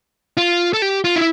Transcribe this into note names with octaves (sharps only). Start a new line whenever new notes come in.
F4
A4
G4
F4
E4